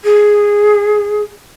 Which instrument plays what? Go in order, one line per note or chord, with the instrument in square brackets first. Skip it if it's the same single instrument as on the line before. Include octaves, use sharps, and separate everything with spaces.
[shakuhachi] G#4